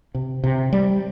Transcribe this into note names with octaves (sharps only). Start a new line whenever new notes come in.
C3
C3
G3